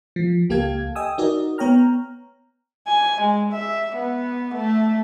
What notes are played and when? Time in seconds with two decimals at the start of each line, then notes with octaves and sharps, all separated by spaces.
0.16 F3
0.49 C#2 A#3 G4 A4 F5 G#6
0.95 D#5 G5 G#5 D#6 E6
1.18 D#4 F#4 A#4 D5 D#5
1.58 B3 C#5 G5 A#5 F6
2.88 G#5
3.22 G#3
3.53 E5
3.96 B3
4.55 A3